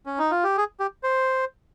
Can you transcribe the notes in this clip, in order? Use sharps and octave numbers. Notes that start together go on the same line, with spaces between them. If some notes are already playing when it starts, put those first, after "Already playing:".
C#4
D#4
F4
G4
G#4
G4
C5